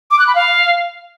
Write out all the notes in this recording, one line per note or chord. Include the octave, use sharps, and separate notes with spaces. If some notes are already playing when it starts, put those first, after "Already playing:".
D6
F#6
B5
F5